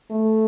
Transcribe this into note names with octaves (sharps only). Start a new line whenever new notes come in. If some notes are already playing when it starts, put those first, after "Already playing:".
A3